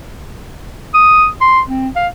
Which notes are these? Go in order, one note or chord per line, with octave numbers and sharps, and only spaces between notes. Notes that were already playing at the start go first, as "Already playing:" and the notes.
D#6
C6
C4
F5